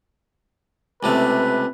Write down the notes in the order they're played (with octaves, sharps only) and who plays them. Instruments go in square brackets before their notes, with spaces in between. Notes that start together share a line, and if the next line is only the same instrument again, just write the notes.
[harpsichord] C#2 C3 A3 [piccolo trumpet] B4